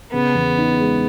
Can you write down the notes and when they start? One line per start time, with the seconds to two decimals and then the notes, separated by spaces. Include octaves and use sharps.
0.12 C#3 B3
0.35 E2
0.58 D#4
0.80 G#3